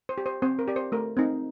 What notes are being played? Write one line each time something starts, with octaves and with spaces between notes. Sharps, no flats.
C5
G4
C5
C4 C5
A#4
G4 D5
C5
A3 A#4
C4 D#4